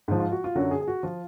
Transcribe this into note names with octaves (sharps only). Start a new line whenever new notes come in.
G#2 F3
F4
F#4
F4
F#2 D3 F#3 F#4
G#4
G#4
F#4
F3 F4